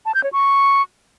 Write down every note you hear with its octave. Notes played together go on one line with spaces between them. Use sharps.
A5
G6
C#5
C#6